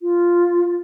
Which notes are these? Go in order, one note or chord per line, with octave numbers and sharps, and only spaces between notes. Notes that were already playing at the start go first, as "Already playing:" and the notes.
F4